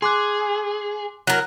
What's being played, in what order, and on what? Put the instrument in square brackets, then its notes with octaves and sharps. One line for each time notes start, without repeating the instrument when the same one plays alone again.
[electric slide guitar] G#4 [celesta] C6 D6 F#6
[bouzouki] F#3 A#4 [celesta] F#6